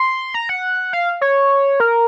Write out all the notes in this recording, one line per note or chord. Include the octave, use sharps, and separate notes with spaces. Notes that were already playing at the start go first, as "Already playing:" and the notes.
Already playing: C6
A#5
F#5
F5
C#5
A#4